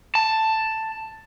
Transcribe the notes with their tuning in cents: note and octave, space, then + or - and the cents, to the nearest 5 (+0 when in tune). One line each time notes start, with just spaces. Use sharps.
A5 +5